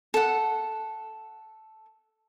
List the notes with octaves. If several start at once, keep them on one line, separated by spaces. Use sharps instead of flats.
A4 F#5